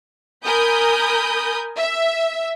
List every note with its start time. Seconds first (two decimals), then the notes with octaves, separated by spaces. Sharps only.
0.45 A#4 G#5 B5 D#6 G6
1.78 E5